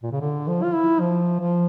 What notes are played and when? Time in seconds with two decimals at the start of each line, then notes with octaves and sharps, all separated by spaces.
0.03 A#2
0.12 C#3
0.21 D3
0.48 F3
0.63 F4
0.74 E4
1.00 F3
1.40 F3